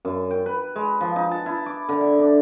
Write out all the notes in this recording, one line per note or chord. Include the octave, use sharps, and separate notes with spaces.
F#2
G5
B4
G#3
F3
D#4
A5
E4
D6
D3
E5
D4